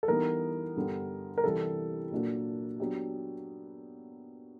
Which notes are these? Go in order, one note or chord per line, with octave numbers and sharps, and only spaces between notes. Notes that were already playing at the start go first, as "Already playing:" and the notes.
A4
E3 G3 B3 D#4 A#4
G2 D3 G3 B3
A#4
C3 E3 G3 A4
A#2 F#3 A#3 D4 F#4
F#3 B3 D4 G4